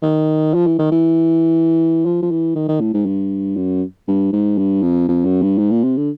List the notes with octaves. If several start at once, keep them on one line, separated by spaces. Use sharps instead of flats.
D#3
F3
E3
D#3
E3
F3
F3
E3
D#3
D#3
A2
G#2
G2
F#2
G2
G#2
G2
F2
F2
F#2
G2
G#2
A#2
C3
D3